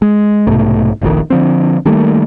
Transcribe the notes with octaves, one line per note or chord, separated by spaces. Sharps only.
G#3
B1 G#2 C3 A3
F1 A#1 F2 D#3
D3 F3 C4
D#3 G3 A3 A#3